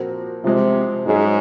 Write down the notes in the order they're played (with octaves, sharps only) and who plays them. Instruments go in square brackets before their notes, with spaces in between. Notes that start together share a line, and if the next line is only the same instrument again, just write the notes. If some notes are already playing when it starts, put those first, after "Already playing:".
Already playing: [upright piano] A#2 F3 C4 F#4 A#4
[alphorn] C3 [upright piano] F3 G#3 C4
[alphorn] G#2 [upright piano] F#3 C#4 G#4